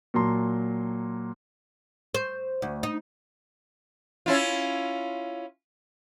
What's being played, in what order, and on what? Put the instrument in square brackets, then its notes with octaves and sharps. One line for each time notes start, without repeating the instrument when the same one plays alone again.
[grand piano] A#2 F#3 A5 A#5 C6
[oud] C5
D2
D#4
[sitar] C#4 E4 F4